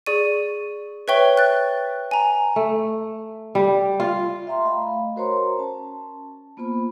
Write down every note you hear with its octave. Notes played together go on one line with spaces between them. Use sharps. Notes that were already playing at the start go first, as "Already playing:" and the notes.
G#4 D5 C#6 D#7
B4 C#5 E5 G5 C#6 G7
F#6 A6
G#5 A#5
A3
G3
F4
E5 G5 A#5 C6
A3 D#5 F5 B5
F#4 A#4 C5 C#5 A#5 C6
C#4 A5
A#3 B3 F4 C5 B5